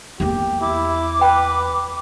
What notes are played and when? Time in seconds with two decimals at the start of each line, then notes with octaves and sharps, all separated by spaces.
0.20 E2 A#3 G4
0.61 E4 D6
1.21 B4 G5